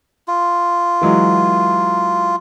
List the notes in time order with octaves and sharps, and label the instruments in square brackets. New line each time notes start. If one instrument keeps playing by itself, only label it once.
[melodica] F4
[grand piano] E3 F#3 G#3